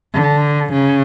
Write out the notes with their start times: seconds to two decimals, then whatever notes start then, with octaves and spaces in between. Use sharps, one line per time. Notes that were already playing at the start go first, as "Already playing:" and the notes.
0.14 D3
0.73 C#3